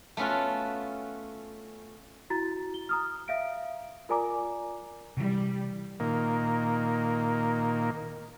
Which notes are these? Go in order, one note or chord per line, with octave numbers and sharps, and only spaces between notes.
A3 B3 C#4 F4 F#4
E4 F#4 A#5 A6
G7
A#5 D#6 F6
E5 F5 D7
F4 A#4 D5 G#5 A#5 D6
C3 E3 G3
A#2 D#3 A#3